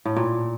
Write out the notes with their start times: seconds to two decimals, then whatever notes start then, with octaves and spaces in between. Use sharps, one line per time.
0.05 A2
0.16 A#2